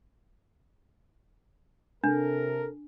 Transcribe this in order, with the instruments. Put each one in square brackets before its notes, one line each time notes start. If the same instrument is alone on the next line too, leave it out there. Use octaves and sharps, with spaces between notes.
[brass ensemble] C3 A4 A#4 [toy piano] D4